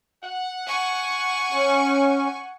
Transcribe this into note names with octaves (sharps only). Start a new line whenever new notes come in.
F#5
G#5 C#6
C#4